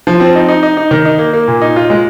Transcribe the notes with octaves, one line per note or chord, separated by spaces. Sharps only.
F3
C4
D#4
D#4
D#4
D#4
D#3
D#4
A#3
A#3
A#2
D#4
F4
G#3